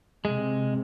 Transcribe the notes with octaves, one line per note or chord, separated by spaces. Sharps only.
C3 G#3